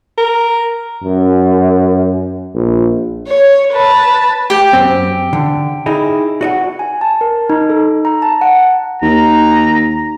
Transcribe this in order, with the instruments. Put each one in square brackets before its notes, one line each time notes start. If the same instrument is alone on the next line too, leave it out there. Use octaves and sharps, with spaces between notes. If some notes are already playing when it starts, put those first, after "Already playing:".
[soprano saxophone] A#4
[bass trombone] F#2
A#1
[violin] C#5
B4 A5
[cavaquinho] G4 G5
[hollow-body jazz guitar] F#2 C4
D3
D#4 E4 G#4
F#4 D#5 F#5
[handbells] G#5
A5
A#4
D#4
A4
A#5
A5
F#5
[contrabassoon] D#2 [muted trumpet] A#5